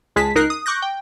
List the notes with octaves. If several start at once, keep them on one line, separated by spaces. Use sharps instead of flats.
C#2 G#3 G#4 A5 B6
C#2 D#4 A#4 F#6 C7
D#6
C#6 D6 F#6 G6 A#6
G5